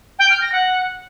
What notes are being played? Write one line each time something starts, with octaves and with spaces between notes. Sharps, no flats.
G5
F6
A#6
F#5